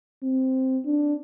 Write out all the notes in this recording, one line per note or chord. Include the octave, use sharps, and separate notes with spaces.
C4
D4